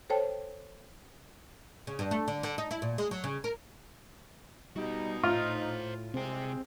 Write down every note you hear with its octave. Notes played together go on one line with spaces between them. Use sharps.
A4 C5 C#5 G5 A5
C#3
G2
A3
D3
D3
D#4
E4
A#2
G#3
F#3
C#3
A#4
G3 B3 D#4 F#4
A2 F4 C5 A#5
C2 C3 G#3 C4 G5